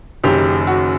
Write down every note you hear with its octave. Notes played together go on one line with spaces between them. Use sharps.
F#1 F#2 D#3 F#3 G4
F#4